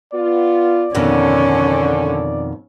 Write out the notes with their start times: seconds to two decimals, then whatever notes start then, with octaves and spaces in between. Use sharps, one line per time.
0.13 B3 F4 D5
0.95 F2 B2 D3 D#3 C#4